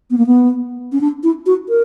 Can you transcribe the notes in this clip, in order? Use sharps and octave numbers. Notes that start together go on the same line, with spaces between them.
B3
A#3
B3
C#4
D4
E4
F#4
A#4